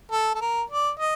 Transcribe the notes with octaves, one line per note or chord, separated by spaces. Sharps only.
A4
A4
A#4
D5
D#5